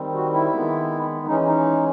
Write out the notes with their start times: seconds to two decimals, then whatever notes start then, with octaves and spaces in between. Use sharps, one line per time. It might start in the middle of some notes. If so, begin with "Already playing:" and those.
Already playing: D#3 G3 C4
0.15 F#4
0.33 E4
0.52 D#3 G#3 B3
1.26 E3 G#3 C#4 D#4
1.46 D#4